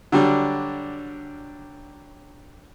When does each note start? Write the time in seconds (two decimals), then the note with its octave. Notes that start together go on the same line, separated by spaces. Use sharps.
0.12 D3 F#3 G3 D4 F#4